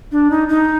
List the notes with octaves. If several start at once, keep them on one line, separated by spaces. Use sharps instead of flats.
D4
D#4
D#4